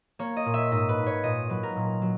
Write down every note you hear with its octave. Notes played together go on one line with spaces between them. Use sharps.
A#3 C#5
D#5
A#2
E5
G#2 D#5
B4
G#2
C#5
A#2 D#5
F#3 B4
A#4
A#2
F#3